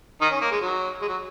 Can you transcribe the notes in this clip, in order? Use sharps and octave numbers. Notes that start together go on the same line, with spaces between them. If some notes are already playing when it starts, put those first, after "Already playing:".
D#3 D#4
C#4
A#3
G#3
F#3
G#3
F#3